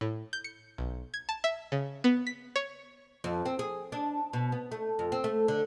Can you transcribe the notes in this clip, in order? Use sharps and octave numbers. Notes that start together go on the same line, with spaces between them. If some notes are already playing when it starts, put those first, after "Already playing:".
A2
G6
C#7
B1
G#6
A5
E5
C#3
B3
B6
C#5
F2
C4
G#4
D4
B2
B3
A3
F2
C4
A3
D3